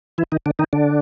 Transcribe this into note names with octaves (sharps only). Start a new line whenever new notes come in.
E3 E4
D#3 D#4
D3 D4
D#3 D#4
D3 D4